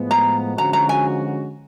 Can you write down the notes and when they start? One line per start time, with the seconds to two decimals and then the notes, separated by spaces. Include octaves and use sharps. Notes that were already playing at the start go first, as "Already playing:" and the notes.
Already playing: A2 F3 G#3 B3
0.11 A#5
0.57 D3 F3 G#3 C#4 F#4 A#5
0.73 A#5
0.89 G#5